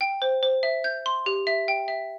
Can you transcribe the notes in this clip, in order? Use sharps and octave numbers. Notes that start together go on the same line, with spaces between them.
G5
C5
C5
E5
G6
C6
G4
E5
G5
E5